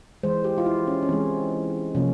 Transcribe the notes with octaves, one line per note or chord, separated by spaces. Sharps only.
E3 G#3 C5
G4
F4
E4
C#4
C#4
E3 G#3 C4
C3 F3 A#3 C#4